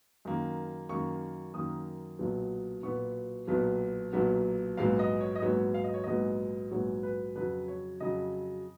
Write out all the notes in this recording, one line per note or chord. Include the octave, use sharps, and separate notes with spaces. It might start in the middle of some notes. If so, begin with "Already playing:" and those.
F#2 D#3 A#3
F#2 D#3 A#3 C#6
F#2 D#3 A#3 D#6
B1 A#2 F#3 B3
B1 A#2 F#3 B3 C#6
B1 A#2 F#3 B3
B1 A#2 F#3 B3
A#1 G#2 F#3 B3 F5
D#5
C#5
D#5
A#1 G#2 F#3 B3 C#5
F5
D#5
C#5
A#1 G#2 F#3 B3 D#5
A#1 G#2 F#3 B3 C#5
B4
F2 C#3 F#3 B4
C#5
F2 C#3 F#3 D#5